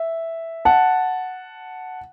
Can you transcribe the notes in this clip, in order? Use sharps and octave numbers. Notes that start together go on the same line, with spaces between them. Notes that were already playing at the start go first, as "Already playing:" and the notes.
Already playing: E5
F#5 A5